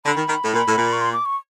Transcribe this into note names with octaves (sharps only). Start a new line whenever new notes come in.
D3 B5
D#3
D#3
A2
A#2 B5
A2
A#2
C#6
C6
D6
C#6